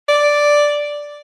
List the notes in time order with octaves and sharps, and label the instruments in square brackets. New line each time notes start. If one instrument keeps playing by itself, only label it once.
[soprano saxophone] D5